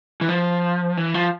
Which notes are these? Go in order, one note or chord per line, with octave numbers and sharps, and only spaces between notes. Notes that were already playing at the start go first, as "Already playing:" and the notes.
E3
F3
E3
F3